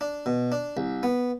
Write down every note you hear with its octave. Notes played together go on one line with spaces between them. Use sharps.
D4
B2
D4
C2
B3